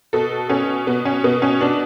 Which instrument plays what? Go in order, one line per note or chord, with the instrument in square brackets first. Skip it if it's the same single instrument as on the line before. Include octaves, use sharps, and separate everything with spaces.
[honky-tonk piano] B2 A4
B2 C#4
B2 B3
C#4
B2 B3
C#4
B2 D4